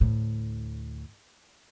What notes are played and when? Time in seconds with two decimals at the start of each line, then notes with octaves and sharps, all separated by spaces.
0.01 D2 A2